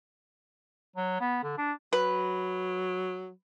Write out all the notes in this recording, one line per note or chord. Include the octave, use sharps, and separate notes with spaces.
F#3
B3
D3
D4
F#3 B4